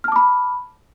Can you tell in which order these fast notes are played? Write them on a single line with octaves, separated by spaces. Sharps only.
F6 A5 D6 B5